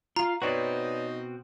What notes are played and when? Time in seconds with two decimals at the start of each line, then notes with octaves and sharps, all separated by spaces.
0.16 F4 F5 A#5
0.42 B2 C4 D#4 F#4 B4 C#5 D5